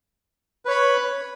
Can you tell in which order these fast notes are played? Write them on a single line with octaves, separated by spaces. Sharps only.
B4 C#5 B5